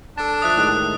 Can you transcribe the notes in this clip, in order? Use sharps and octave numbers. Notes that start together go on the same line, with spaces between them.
D4 A4 A5
F3 E5 D#6 F#6 A6
A2 D#3 G#3